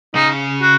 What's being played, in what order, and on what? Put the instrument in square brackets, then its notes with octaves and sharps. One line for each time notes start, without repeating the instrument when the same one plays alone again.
[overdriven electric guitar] C#3 [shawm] D#4
[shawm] F#4